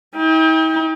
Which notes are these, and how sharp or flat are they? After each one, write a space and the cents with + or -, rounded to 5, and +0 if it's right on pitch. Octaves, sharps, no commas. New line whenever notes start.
D#4 +45 G5 +25